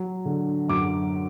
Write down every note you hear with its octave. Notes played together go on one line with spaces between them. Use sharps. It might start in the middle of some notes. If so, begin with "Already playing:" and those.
Already playing: F#3
D3
F#2 D6